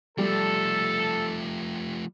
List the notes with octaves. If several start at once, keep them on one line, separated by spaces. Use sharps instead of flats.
F3 G3 A3 A4